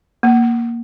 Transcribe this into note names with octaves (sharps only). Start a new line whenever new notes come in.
A#3